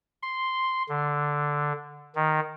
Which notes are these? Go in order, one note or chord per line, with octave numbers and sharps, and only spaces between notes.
C6
D3
D#3